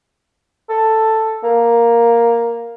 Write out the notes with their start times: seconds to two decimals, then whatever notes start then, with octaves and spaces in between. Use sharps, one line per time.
0.69 A4
1.44 A#3